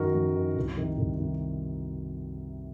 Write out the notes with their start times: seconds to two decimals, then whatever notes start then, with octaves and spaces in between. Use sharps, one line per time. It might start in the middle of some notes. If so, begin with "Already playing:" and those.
Already playing: F#2 D#3 F#4 A#4
0.15 F#2
0.36 D#3
0.56 C2
0.77 C3 D#3
0.98 C2
1.19 C3 D#3